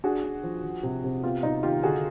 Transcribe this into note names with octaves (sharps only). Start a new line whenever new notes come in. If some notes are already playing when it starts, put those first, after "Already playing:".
D4 F#4 G#4
D4
F3
F3
C3
C3
B3 F4 G4
C3 D#4 F4
D#3 F4 G4
D3 F#4 G#4